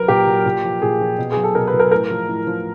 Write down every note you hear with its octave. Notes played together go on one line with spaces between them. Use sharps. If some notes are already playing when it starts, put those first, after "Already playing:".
Already playing: F#3 A#4 B4
A#2 G4
F#3
A#2
F3
A#2 G#4
F3
B2
F#3 G#4
A4
B2 A#4
B4
F#3
A#4
A2 A#4
F3
A2
F3